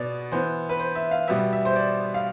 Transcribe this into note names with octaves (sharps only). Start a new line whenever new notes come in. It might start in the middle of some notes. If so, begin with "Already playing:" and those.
Already playing: B2 B3 D5
E3 B3 C5
B4
C5
E5
F5
B2 G3 B3 E5
E5
C5
D5
F5